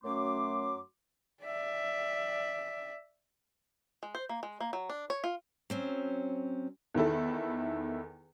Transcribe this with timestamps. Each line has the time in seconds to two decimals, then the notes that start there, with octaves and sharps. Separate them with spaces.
0.03 F#2 F#3 A3 C#4 C6 D6
1.44 D5 E5
4.03 G#3
4.15 C5
4.29 A#3
4.43 G#3
4.60 A#3
4.73 F#3
4.90 D4
5.10 C#5
5.24 F4
5.70 F#3 C4 C#4
6.94 E2 D#3 E4 A4